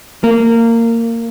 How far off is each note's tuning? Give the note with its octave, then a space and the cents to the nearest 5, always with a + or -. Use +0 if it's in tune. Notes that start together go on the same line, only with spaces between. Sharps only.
A#3 -20